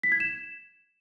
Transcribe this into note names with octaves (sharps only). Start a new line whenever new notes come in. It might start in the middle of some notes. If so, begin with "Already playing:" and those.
B6
G#6
E7